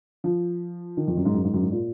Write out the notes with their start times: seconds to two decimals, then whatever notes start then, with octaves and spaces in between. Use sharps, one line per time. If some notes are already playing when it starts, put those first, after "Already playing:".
0.24 F3
0.97 D#3
1.08 F2
1.17 F#2
1.25 G#2
1.34 F#2
1.44 G#2
1.54 F#2
1.62 G#2
1.71 A#2